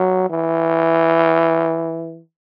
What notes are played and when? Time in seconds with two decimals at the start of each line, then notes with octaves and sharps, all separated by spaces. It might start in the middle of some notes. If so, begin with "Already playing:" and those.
Already playing: F#3
0.30 E3